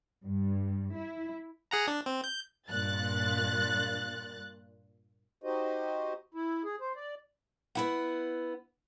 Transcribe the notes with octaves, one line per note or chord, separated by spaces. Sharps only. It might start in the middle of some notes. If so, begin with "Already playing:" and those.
G2
E4
G#4 F#5 A#5
D4
C4
G6
G2 A#2 F#6 A6
D#4 F#4 G4 C5 D#5
E4
G#4
C5
D5
B3 E4 F#5